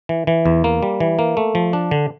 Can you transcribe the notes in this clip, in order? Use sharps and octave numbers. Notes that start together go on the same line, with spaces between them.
E3
E3
E2
A#3
G3
E3
A#3
A3
F3
D4
D3